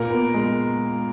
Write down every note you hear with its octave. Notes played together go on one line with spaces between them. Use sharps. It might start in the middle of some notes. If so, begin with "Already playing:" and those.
Already playing: A#2 A#3 A#4
B3
G#3